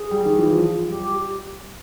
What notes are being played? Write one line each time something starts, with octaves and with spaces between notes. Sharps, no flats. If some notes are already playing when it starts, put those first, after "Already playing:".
Already playing: G#4
G3
D#3
E3
F3
G3 G4